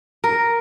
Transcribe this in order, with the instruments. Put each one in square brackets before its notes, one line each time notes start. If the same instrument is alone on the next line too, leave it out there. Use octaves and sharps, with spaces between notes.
[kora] A#4